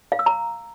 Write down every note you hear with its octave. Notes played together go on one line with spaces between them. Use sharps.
F5
E6
A#5